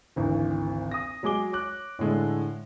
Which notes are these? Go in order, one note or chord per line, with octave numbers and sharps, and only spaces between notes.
G#1 D2 E3
D#6 A#6
F#3 G#3 G#4 D6 G7
C#5 D6 F#6
A2 D3 G#3 A4